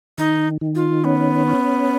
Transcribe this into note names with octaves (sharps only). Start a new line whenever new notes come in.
D#3 D#4
D#3
F4
B3 C#4
C#4